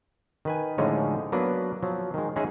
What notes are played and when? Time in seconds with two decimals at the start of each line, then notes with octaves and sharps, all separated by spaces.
0.45 D#3 B4 G#5
0.78 A2 D3 F3 G#3 C#4 D#4
1.32 F#3 A#3 B3 D4 B4
1.83 F3 F#3
2.14 D#3 G#3
2.36 G#3 C#4 D#4 G#4 E5 F#5